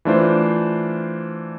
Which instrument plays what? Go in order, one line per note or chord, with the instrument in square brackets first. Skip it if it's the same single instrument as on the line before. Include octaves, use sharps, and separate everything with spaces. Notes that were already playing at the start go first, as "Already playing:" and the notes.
[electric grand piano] E3 A3 D4 F4 C5